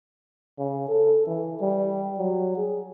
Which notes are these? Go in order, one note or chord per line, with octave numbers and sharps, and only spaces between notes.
C#3
A4
E3
G3
F#3
G#4